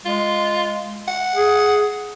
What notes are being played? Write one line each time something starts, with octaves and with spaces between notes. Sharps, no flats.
G#3 F4
F#5
G#4